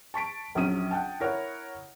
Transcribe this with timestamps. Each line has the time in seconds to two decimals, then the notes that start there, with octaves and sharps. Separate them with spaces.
0.14 A5 C#6 B6 D7
0.55 A#1 F#3 C#4 D#6 D#7
0.91 F#5 G5 A5
1.20 E4 A#4 C#5 F#5